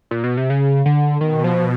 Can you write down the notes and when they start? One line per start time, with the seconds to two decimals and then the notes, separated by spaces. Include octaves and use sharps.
0.11 A#2
0.24 B2
0.37 C3
0.50 C#3
0.86 D3
1.20 B2 D#3
1.44 F3